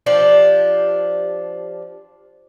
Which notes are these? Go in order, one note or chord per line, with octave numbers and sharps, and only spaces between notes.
F3 D4 G4